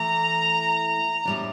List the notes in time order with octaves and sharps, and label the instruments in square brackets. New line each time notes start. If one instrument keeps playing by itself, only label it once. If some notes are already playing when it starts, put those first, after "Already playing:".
Already playing: [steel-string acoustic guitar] E3 A3 E4 [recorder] A#5
[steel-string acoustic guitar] A2 G3 D4